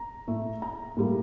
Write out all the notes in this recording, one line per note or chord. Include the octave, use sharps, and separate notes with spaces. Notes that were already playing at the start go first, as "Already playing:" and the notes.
Already playing: A#5
A2 A3
A#5
A2 G3 A#3